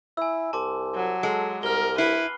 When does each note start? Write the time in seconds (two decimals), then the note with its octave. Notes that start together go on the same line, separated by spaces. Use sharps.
0.17 E4 G#5 E6
0.53 C2 A5 C6 D6
0.94 F#3
1.23 G#3 A4
1.63 C2 A#4 F6 G7
1.98 E4 B4 C7 F#7